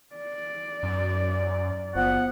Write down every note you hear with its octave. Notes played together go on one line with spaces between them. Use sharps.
D5
F#2
F#1 F3 B3 F#5